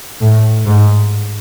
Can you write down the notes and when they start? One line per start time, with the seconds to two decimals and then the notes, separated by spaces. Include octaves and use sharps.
0.21 A2
0.66 G#2